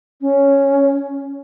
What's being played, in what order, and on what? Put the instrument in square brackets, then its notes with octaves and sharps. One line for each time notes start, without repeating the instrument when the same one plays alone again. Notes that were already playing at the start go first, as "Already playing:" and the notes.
[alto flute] C#4